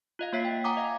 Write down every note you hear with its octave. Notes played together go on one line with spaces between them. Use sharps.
F4 D#5 F5
A#3 F4 C#5 E5 B6 C7
G5
F#5 G#5 A#5 D6 D#6
D#5 F5